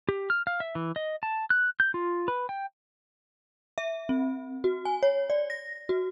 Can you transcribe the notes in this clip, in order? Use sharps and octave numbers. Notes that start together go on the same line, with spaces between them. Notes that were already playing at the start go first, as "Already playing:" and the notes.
G4
F6
F5
E5
E3
D#5
A5
F#6
G6
F4
B4
G5
E5
C4
F#4
G#5
C#5
D5
A#6
F#4